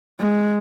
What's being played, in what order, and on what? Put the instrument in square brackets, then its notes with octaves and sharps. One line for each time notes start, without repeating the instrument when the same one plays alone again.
[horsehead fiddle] G#3